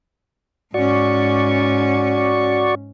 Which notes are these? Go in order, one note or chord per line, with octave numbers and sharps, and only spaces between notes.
G#2 C#4 F#4 D5 C#6